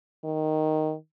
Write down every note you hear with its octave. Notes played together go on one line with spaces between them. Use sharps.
D#3